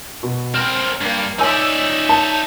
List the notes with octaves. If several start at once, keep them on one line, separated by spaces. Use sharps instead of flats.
B2
C4 A#4 F6
G2 A#3
D#4 C#5 D5 E5 G#5 E6
A5